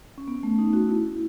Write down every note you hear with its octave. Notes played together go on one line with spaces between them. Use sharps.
C#4
B3
A3
D#4
F#4
E4